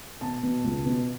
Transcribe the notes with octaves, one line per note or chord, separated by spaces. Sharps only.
B2 A5
B2
C#2
B2